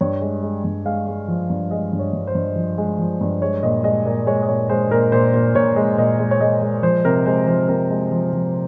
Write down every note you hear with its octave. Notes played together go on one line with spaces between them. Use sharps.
G2 C#5
G#3
G#3
G2
G#3 F5
G#3
F3
G2
G#3 D#5
G2
C#5
G2
C5
G2
F3
G#3
F3
G2
G#3 C#5
A#2 D#5
G#3 D#5
A#2
G#3 C#5
D#5
A#2 C#5
G#3 C5
A#2 A#4
A#2 C5
A#2
A#2 C#5
G#3
A#2 D#5
G#3
C#5
G#3 D#5
G#3
F3 C5
C3 A#4
G#3 C5
F3 C5
C3 A#4
G#3
F3
F3